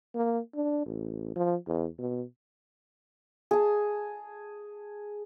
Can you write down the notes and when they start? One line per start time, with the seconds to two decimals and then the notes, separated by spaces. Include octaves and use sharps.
0.15 A#3
0.55 D4
0.86 A1
1.36 F3
1.67 E2
1.98 B2
3.51 G#4 A5